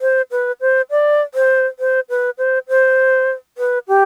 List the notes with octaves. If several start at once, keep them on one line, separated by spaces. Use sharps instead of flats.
C5
B4
C5
D5
C5
C5
B4
C5
C5
B4
G4